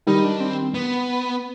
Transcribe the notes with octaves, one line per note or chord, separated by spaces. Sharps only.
D#3 G3 D#4
D4
C4
B3